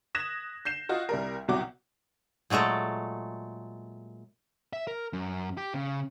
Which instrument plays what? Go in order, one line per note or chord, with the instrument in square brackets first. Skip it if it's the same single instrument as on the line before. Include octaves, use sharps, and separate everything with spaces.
[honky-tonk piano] D#6 F#6 G#6 A#6 B6 E7
G6 C7 E7
F4 F#4 D#5
C2 G3 A#4
C2 B2 F#3 F#4 G4 D6
[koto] A#2 F#3 G#3 A3 A4
[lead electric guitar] E5
A#4
F#2
G4
C#3